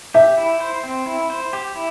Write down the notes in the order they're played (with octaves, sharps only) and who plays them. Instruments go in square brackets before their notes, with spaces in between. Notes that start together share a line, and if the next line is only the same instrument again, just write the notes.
[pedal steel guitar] G4 [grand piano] E5
[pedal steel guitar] E4
C5
C4
E4
C5
G4
E4